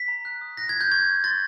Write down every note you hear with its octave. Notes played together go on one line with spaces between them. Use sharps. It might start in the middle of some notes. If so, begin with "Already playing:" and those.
Already playing: B6
A#5
F#6
D#6
F#6 A#6
F#6 G#6
G6
C#6 G#6
C#6
C6 A6